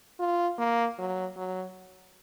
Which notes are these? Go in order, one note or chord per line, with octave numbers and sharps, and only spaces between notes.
F4
A#3
F#3
F#3